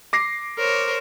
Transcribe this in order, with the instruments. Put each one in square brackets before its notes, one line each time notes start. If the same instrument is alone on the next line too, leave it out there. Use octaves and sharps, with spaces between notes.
[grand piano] D6 A#6 C7
[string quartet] A#4 C5 C#5